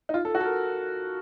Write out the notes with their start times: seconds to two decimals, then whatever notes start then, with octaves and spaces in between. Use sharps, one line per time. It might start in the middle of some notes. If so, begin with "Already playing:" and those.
0.09 D#4
0.14 F4
0.25 A4
0.35 F#4
0.40 A4
0.45 A#4